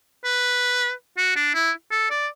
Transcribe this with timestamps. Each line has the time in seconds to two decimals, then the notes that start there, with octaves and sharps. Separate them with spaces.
0.24 B4
1.17 F#4
1.36 D4
1.54 E4
1.91 A4
2.10 D5